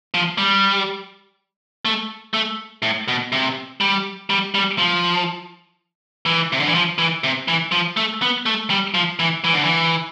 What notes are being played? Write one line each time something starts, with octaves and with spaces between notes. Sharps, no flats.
F3
G3
A3
A3
A2
B2
C3
G3
G3
G3
F3
E3
C3
D3
E3
F3
E3
C3
E3
F3
A3
B3
A3
G3
F3
E3
E3
D3
E3